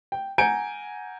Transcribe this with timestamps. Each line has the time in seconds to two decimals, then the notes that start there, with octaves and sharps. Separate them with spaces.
0.12 G5
0.38 F#5 G#5 A#5 G6 C#7 D7